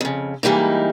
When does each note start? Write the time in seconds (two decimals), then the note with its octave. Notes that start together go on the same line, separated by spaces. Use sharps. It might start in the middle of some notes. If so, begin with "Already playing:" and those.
0.01 F2 C#3
0.43 G#2 E3 G3 A#3 D#4